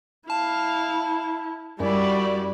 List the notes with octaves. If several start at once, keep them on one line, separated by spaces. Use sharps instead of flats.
E4 F5 A5
F#2 G3 E4 F#4 D5